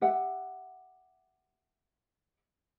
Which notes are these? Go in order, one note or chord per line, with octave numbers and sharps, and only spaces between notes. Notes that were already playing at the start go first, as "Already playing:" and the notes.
G4 E5 F#5